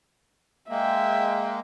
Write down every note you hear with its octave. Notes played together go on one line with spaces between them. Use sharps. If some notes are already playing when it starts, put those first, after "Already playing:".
G#3 A#3 E5 G5